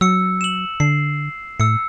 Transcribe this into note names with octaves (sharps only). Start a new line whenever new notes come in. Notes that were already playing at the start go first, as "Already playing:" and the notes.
F#3 E6 C#7
E7 F#7
D3 C7
A2 E6 C#7